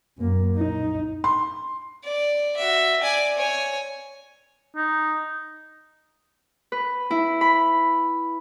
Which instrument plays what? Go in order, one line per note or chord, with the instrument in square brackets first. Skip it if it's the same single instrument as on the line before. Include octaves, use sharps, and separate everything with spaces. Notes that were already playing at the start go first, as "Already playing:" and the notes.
[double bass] F#2 A#3
D#4
[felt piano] C6
[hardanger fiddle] D5
F#4 E5
D5 G#5
C#5 G#5
[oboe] D#4
[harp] B4
E4
B5